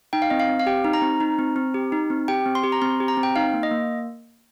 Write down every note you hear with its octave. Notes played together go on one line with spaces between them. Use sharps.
D#4 G5
F5
C4 D#5
F5
C4
F5
G4 G5
D#4
A#5
C4
D#4
C4
C4
G4
D#4
C4
G4 G5
C4
C6
G4
A#5
C4 C6
G4
A#5
C4
G5
D#4 F5
A#3
D#5
A#3